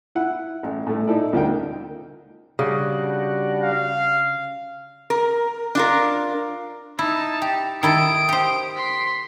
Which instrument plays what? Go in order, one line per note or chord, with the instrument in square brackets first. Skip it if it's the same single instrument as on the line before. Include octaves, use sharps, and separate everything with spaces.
[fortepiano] E4 F#5
A1
A2 A3
D#4 E4 A4 D5
D2 C#3 D4 D#4 A#4 G5
[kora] C#3 [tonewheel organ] G3 D4 F#4
[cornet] F5
[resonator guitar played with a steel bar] A#4
D4 F4 A#4
[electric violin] D#4 A5 [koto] E4
[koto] G4
[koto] D#3 E4 A4 [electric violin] D#6 D7
[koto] G4 C5
[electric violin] C6 B6